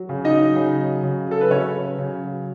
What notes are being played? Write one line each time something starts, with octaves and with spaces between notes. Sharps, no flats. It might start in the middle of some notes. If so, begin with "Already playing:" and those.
Already playing: F#3
C#3
D#4 D#5
F#3
C#3
F#3
C#3
F#3 A4
B4
C#3 C#4 C#5
F#3
C#3
F#3